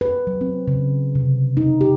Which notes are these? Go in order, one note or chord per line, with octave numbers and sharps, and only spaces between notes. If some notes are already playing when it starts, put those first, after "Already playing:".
B4
F#3
C4
C#3
C3
D#4
G4